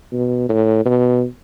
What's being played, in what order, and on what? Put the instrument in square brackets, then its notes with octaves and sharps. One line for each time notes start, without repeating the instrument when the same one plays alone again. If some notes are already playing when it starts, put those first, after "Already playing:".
[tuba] B2
A2
B2